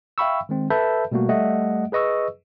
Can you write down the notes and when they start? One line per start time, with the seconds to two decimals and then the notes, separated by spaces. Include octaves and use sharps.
0.18 E5 F5 G5 B5 C#6 E6
0.49 D#3 G#3 C4
0.70 A4 B4 E5 A5 B5 G6
1.12 B2 G3 A3 A#3 F#4
1.29 G3 A3 D#5 E5 F#5
1.92 G#4 B4 D#5 C#6 E6